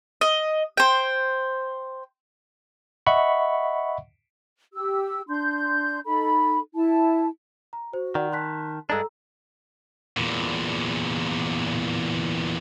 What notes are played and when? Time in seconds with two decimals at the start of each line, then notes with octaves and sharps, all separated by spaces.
0.21 D#5
0.77 C5 G5
3.06 D#5 E5 F#5 B5 C#6
4.73 G4 E6
5.29 D4 C6 G6
6.05 D#4 A4 B5
6.75 E4 A5
7.73 A#5
7.93 F#4 C5
8.15 D#3 D5 F#5
8.32 A5 C6 F#6 B6
8.90 G2 G#3 D4 A4 A#5 E6
10.17 E2 A#2